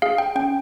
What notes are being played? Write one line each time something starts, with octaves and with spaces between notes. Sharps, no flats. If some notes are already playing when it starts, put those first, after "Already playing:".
G#4 F5
G5
C#4 G5